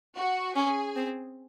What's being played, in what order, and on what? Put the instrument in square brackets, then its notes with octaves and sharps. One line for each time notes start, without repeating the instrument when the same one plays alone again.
[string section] F#4
[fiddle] C#4 [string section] G#4
[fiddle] C4